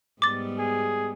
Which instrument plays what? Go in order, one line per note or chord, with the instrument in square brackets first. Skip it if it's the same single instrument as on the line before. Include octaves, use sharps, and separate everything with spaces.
[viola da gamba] G#2 G3 B3 [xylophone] D6 A6
[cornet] G#4